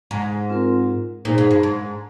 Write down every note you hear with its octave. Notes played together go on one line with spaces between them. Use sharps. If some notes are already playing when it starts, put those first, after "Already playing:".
G#2
C4 F4 A#4
A#2 D#4 G#4 C5
G#2
G2
G#2